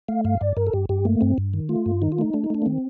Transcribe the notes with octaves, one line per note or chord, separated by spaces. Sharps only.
A3 F5
G2 F5
G2 D5
G2 A#4
A4
G2 G4
G2 G4
A3 A#3
G2 C4
G2
D#3
A3 F4
G2
D#3 D#4
F4
A3 D#4
A3 D4
D#4
A3 D4
A#3
D#3 C4